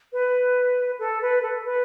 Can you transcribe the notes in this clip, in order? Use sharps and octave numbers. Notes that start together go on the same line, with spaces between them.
B4
A4
B4
A4
B4